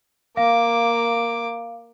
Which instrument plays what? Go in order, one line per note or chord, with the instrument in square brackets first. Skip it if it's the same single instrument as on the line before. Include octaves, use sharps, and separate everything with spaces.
[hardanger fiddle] A#3 D6 [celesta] F5